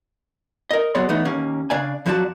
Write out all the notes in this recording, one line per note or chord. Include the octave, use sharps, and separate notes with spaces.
A#4 D#5
F#3 B3 G#4 C#5 D5 C6
E3 A3 B3 D#4
D#2 A#3 C#4
C#3 D4 D5 F5 G#5
F2 F3 F#3 F#4 D5 A5